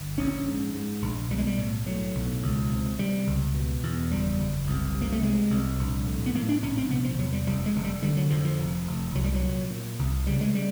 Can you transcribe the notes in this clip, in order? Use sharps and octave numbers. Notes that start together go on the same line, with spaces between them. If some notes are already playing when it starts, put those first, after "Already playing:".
Already playing: G1
A#1 C#4
G#2
G#2
A#1
B1 G3
G#3
G3
A2
A2 F#3
B1
C#2
C3
C3 G3
C#2
B2
E2
F#1 G3
F#1
C2
C3
A#3
A3
C3 G#3
C2
A#1
A2
B3
A2 A#3
D4
A#1 C#4
C4
C3 B3
F3
E2 F#3
G3
F1 G3
G#3
F1
G3
D3 G3
F#3
F2 F3
F3
F1
F1
C2 F#3
G3
F#3
A#2
A#2
C2
C#3 G3
G#3
G3